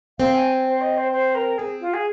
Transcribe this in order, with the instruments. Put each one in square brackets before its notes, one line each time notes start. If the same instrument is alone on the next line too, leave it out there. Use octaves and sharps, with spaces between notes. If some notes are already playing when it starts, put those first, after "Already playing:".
[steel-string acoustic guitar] C4 [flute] F5
[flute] G#5
C5
D#5
C5
C5
A#4
[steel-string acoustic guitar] C4 [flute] G#4
[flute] F4
G#4